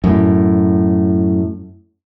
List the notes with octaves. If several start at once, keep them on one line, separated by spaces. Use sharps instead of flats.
F#2 A2